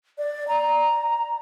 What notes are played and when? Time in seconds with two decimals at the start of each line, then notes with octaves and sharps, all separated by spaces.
0.18 D5
0.48 A#5